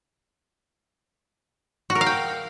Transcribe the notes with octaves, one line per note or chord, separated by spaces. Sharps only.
F#4
A#4
F5
G5